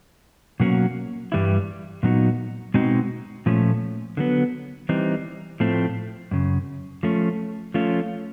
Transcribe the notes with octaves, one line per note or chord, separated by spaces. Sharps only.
B2 F#3 A#3 C#4 F#4
G2 E3 G3 E4
A#2 F#3 B3 D#4 F#4
B2 G#3 C4 D#4 F#4
A#2 F3 A3 C#4
D3 F#3 B3
E3 G3 C4 D#4
A2 F3 A3 C4
F#2 C#3
F3 A3 C#4
F3 A3 C#4 F4